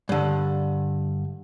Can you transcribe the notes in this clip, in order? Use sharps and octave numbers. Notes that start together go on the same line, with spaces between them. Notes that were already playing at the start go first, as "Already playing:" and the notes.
G2 D3